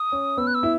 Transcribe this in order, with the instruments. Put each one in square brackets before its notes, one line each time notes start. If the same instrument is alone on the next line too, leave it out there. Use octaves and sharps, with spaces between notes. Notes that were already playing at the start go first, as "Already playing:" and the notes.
Already playing: [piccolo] D#6
[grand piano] C#4
[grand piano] B3 [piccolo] E6
[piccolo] F#6
E6
[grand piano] E4